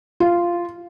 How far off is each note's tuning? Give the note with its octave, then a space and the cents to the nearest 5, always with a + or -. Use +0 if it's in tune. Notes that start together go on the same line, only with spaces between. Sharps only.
F4 -10